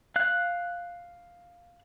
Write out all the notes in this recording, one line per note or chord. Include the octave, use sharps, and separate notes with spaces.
F5 F#6